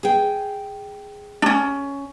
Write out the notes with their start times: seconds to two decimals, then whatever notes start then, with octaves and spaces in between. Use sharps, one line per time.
0.03 G#4 G5
1.42 C#4 D4